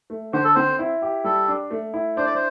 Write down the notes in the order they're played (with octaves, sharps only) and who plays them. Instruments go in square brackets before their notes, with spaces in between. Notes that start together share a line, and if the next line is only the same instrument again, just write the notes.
[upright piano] A3
[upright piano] D3 [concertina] C5
[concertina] A4
[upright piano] C4 [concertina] C5
[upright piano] E4
G4
[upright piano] G3 [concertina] A4
[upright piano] D4
A3
E4
[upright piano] D4 [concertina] C5
[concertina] D5
C5